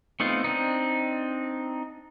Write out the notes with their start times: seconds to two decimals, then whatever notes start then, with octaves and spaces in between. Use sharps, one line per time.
0.20 A3 B3 C4 D#4 F4
0.44 C4 D4 D#4